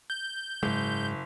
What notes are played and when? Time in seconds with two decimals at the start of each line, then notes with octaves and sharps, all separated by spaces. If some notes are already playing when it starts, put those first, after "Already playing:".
0.10 G6
0.63 F#1 G#2 G#3